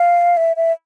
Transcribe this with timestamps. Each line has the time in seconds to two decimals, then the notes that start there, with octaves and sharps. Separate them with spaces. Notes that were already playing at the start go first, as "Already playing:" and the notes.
Already playing: F5
0.37 E5
0.56 E5